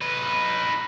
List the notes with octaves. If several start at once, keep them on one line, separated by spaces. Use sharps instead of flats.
D#4 B4